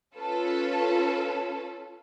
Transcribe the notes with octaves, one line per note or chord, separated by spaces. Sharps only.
C#4 F4 A4 B4